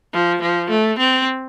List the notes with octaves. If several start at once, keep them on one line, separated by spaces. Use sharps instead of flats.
F3
F3
A3
C4